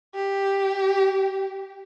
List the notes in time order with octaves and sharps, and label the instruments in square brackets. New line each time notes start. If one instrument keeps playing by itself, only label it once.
[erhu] G4